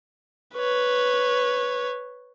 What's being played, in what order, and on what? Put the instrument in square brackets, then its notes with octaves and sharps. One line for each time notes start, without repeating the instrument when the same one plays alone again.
[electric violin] B4 C#5